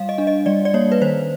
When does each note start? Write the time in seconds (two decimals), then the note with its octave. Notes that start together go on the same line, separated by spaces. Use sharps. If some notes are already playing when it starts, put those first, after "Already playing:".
Already playing: G3 F5
0.09 D#5
0.18 D4
0.27 D#5
0.46 G3 D5
0.65 D5
0.74 A#3 C#5
0.92 B4
1.02 D#3 C5